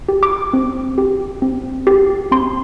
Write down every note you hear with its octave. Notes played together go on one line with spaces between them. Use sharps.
G4
D6
C4
G4
C4
G4
C4 C6